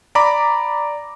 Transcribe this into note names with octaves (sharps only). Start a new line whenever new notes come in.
D5 A#5 B5 D6